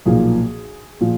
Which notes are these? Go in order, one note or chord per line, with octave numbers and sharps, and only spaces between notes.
B1 A#2 F3 A#3 G#4
A#2 F3